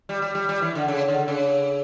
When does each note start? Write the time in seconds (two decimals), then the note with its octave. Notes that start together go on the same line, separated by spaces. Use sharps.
0.09 G3
0.22 G3
0.35 G3
0.49 G3
0.62 E3
0.75 D3
0.88 C#3
1.08 D3
1.28 C#3